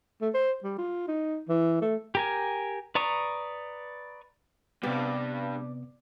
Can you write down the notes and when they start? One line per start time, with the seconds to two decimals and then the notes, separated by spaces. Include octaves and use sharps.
0.22 A3
0.34 C5
0.63 G3
0.78 F4
1.08 D#4
1.49 E3
1.82 A3
2.15 G4 A#4 G#5
2.95 B4 D5 A#5 C#6 D#6
4.83 G2 C3 B3 D5